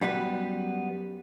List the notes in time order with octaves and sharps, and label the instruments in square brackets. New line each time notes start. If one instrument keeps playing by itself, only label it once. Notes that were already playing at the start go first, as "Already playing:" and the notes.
[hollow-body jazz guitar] F#2 G3 B3 B4